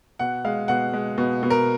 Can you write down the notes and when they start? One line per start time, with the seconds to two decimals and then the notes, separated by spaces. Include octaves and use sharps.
0.19 B2 F#5
0.45 G#3 F5
0.68 B2 F#5
0.93 G#3
1.18 B2
1.43 B2
1.50 A#4